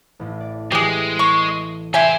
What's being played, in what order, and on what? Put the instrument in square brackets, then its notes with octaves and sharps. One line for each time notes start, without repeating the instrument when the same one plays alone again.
[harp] A1 A2
D5
[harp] E3 F#6 [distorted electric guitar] G#3 [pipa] G4 G#4
[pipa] C#6
[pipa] E4 G5 G#5 [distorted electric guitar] G4 C5